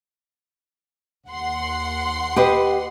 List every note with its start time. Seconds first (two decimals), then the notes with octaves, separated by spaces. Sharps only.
1.28 D#2 F#5 C6
2.36 G4 B4 D#5